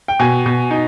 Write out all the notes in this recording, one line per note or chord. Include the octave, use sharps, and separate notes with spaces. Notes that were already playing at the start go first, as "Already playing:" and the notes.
G5
B2 G#5
B2
D#4